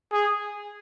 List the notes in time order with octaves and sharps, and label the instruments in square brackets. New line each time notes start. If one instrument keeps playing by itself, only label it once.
[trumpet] G#4